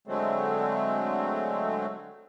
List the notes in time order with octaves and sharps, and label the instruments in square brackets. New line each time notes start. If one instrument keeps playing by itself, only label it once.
[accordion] D3 F#3 G#3 A3 C4